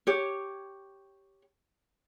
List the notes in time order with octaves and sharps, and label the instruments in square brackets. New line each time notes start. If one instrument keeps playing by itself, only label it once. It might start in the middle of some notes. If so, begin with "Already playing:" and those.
[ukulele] G4 C#5